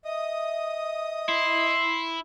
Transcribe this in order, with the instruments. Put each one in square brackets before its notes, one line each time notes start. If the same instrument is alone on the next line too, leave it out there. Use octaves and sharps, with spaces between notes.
[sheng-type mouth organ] D#5 D#6 [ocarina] E5
[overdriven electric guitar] E4 [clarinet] C6